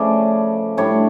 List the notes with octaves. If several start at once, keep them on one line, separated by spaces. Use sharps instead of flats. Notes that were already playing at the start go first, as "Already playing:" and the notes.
Already playing: C#3 F3 A3 D5
A2 G3 D4 C#5